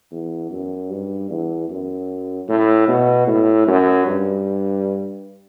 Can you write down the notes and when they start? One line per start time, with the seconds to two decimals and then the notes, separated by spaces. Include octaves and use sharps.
0.12 E2
0.51 F#2
0.90 G2
1.30 E2
1.70 F#2
2.48 A2
2.88 B2
3.27 A2
3.67 F#2
4.07 G2